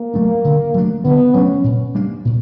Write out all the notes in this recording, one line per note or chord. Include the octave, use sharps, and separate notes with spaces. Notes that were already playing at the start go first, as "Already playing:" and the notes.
Already playing: A#3
F#3 A3 D4
D3
F#3 A3 D4
D3 B3
F#3 A3 C#4 D4
A#2
G3 A#3 D4
A#2